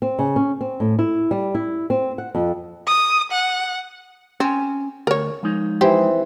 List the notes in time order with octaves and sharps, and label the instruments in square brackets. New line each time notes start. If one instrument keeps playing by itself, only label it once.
[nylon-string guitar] C4
C#3
C#4
C4
A2
E4
G3
E4
C4
F#5
F2
[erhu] D#6
F#5
[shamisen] C4 [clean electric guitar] C#4 G#5
[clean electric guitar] D2 [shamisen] A#4 C#5
[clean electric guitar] F3 G#3 D#4
[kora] E3 C4 [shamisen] G4